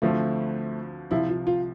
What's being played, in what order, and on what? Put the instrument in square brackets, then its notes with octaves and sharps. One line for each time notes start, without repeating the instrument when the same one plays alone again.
[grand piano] D2 D3 F3 C4 [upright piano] A3
[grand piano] C2 C3 F3 [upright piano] E4
[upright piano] F4
F4